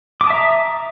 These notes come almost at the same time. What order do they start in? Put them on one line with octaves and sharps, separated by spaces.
D6 D#6 A5 E5 A#5